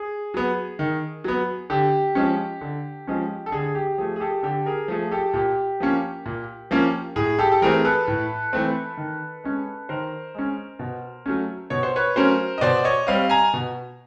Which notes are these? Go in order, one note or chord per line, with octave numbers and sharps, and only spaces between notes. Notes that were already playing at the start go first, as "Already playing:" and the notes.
Already playing: G#4
F#3 B3
D#3
F#3 B3
D3 G4
F3 G#3 C#4
D3
F3 G#3 C#4
A4
D3 G#4
G#4
G4
F3 A3 G#4
G#4
G4 A4
D3 G4 A4
G#4 A#4
F3 A3 G#4
G4 A4
A#2 G4
F3 A#3 C#4
A#2
F3 A#3 C#4
A2 G#4
G4 A4
A4
E3 A3 C4 G#4 A#4
A4 B4
A2
E3 A3 C4
D#3
G#3 C#4
D#3 A#4 C5
G#3 C#4
B2
F#3 A3 C#4
B2 C#5
C5
B4 C#5
F#3 A3 C#4 A#4 C5
D#5
B2 C5 D5
C#5 D#5
G3 C4 D#5 F5
G#5 A#5
B2